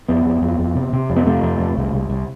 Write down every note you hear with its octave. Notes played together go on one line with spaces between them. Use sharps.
F2 B3
F2
F2
F2
C3
C3
F2
B3
C3 A3
F2
F2
C2
C2
C2